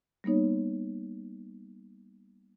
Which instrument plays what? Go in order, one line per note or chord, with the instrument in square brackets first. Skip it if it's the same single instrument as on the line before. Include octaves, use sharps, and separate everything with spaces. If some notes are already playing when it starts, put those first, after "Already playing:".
[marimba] G3 A#3 B3 D#4 C#5